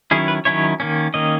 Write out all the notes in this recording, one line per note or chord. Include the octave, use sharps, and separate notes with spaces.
D#3 F#3 C#4 E4 G#4
B4
D#3 F#3 C#4 E4 C#5
D#3 A#3 C#4
D#3 A#3 C#4 D#5